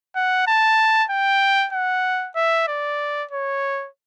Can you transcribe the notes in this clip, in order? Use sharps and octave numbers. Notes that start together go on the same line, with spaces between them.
F#5
A5
G5
F#5
E5
D5
C#5